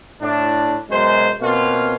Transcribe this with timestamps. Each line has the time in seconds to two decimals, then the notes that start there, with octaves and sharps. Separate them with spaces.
0.21 A2 D4
0.90 F#2 B2 G#3 C5
1.40 B2 A#3 C4 C#4 F4